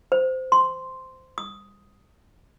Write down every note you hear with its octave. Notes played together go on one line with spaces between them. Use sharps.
C5
C6
D#6